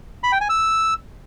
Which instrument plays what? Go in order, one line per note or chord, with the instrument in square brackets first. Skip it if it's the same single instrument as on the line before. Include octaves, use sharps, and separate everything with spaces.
[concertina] B5
G5
G#5
E6